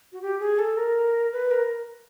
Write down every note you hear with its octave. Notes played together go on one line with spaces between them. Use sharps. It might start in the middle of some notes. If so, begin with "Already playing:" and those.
F#4
G4
G#4
A4
A#4
B4
A#4